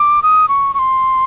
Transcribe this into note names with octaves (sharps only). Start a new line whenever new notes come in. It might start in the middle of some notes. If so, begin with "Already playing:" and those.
Already playing: D6
D#6
C#6
C#6
C6